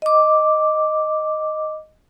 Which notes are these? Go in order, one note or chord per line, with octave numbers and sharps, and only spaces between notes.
D#5 D6